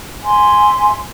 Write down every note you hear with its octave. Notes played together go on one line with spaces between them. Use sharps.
E5 G#5 C6